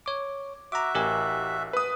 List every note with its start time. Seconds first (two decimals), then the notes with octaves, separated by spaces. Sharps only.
0.06 C#5 D6
0.72 F#4 E5 A#5 D6
0.95 A1 G4 A#4 G#5
1.73 B4 D#6